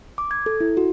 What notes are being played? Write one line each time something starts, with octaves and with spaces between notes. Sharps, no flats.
D6
G#6
A4
E4
F#4